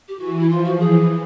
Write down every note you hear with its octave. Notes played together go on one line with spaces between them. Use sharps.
G4
E3 F#4
E4
F3 F4
F#4
E3 G#4